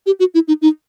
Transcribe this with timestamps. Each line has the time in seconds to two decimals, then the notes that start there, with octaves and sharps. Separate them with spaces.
0.06 G4
0.20 F#4
0.34 E4
0.48 D#4
0.62 D#4